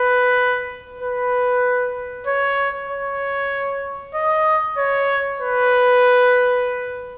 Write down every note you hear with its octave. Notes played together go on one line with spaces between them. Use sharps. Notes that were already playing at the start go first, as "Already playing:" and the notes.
Already playing: B4
B4
C#5
C#5
D#5
C#5
B4